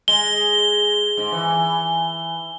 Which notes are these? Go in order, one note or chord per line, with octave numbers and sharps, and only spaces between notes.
G#3 G7
G#2
E3